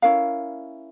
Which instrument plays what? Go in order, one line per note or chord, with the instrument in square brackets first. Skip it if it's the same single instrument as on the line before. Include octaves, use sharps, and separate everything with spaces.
[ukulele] C#4 E4 A#4 F5